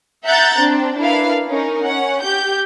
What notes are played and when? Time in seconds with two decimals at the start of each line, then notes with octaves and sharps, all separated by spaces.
0.25 E5 F#5 A#5 F#6 G6 A6
0.59 C4 D4
0.97 D4 E4 A#4 B4 F5
1.48 C#4 D#4 A#4
1.83 C#4 F#5
2.23 G4 G6